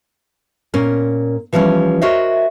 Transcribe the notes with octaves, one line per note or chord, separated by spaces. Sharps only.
A#2 C#4 A#4
E3 F3 G3 A#3 C#4
F#4 A#4 C5 C#5 D#5 E5